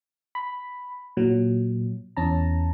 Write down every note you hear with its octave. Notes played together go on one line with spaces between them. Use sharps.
B5
A#2 F#3
E2 C#4 A5 A#5